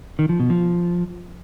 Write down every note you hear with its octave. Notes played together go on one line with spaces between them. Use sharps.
D#3
F3
B2
F3